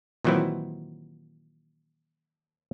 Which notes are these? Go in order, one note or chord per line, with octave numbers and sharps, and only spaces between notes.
A#2 D#3 E3 F#3 C4 E4